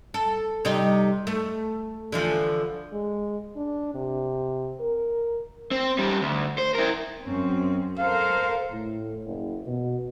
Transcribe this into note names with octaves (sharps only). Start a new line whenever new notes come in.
A4
C3 G3 D#4
A3
D3 E3 F3
G#3
D4
C3
A#4
C4
G3 C#4
D2
C5
E4 A#4
F#2 C4 C#4
A4 A#4 C5 F5
A2
F#1
B2